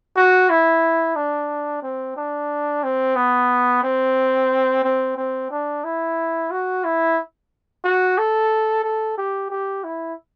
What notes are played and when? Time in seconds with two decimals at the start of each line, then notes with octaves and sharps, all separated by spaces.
0.16 F#4
0.50 E4
1.16 D4
1.82 C4
2.17 D4
2.84 C4
3.16 B3
3.83 C4
4.84 C4
5.17 C4
5.51 D4
5.84 E4
6.51 F#4
6.84 E4
7.84 F#4
8.18 A4
8.84 A4
9.18 G4
9.51 G4
9.84 E4